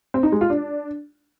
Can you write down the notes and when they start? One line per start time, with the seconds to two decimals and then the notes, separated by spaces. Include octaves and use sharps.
0.14 C4
0.23 D#4
0.32 G#3
0.41 F4
0.50 D4